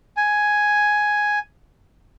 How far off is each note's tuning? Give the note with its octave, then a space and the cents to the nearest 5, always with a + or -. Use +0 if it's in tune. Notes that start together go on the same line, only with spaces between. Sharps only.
G#5 +5